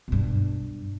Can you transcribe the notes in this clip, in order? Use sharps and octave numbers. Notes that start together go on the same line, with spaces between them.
G2 B2